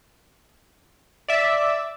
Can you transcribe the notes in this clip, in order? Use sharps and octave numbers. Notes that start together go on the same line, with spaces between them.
D5 E5